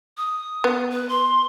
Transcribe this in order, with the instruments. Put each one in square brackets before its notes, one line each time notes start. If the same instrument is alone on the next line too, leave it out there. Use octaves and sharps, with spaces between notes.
[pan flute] D#6
[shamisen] B3
[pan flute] B4
C6